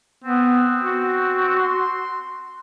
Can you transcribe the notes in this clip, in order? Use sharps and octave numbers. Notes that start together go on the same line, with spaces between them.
B3 C4
F#4
C6